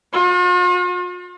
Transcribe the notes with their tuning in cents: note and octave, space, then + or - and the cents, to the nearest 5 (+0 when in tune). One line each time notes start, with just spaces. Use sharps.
F4 +45